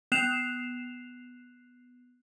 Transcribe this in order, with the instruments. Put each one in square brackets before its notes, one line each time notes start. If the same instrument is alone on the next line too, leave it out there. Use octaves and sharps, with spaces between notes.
[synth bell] B3 F#6 C7 E7 F7